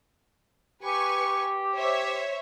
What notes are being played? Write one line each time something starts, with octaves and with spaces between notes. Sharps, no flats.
G4 B4 G#5 C#6
C5 C#5 E5